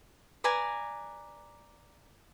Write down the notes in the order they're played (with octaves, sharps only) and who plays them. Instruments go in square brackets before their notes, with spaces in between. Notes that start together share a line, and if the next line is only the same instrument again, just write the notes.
[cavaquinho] B4 D5 G#5 A#5